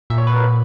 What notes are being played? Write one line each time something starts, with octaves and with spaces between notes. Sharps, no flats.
A#2 E5
C#5
B4
A#4
A#2